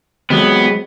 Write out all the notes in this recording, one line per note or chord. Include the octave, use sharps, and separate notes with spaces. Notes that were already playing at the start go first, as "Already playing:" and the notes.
F#3 G#3 B3 C4